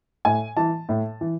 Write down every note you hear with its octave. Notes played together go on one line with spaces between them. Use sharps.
A2 G#5
E3 A5
A2
E3